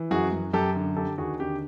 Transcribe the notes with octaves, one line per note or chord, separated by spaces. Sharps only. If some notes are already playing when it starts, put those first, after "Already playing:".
Already playing: E3
F#2 F#4 G#4
F#2
F#2 G4 A4
D3
D3 G4 A4
D#2 F#4 G#4
D3 G4